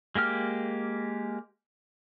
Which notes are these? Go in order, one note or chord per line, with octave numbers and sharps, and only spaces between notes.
G#3 A#3 G4 F6